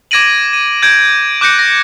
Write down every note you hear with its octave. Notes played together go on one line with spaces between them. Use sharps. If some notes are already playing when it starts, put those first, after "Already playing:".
D6 G#6 A#6 D7 D#7 F#7
D#7
G6 G#6 D7
D6 F#6 G6 A#6 C#7
A#6